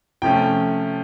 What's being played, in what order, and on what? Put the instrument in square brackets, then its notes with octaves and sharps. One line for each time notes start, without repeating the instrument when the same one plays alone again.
[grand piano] C3 F3 A3 C#4 G5